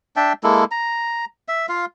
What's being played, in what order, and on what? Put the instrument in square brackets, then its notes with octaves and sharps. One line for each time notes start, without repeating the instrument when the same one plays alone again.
[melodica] D4 E5 G5 A5
G#3 A#3 E4 A4
A#5
E5
F4 F5